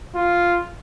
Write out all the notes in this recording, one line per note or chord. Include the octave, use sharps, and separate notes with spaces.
F4